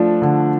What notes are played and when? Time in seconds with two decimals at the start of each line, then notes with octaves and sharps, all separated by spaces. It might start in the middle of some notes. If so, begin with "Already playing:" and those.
Already playing: F3 A3 D4
0.22 D3